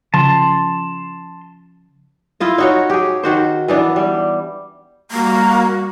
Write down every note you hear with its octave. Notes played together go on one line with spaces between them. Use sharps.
C#3 F3 A5 C6
E4 F4 D#5
D#4 F#4 C#5
G4 G#4
D#3 F#4 C5
E3 B3 D4
G3
G3 A#3 F#4